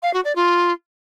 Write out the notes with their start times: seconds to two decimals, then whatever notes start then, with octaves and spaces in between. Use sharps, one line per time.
0.03 F5
0.13 F#4
0.24 D5
0.35 F4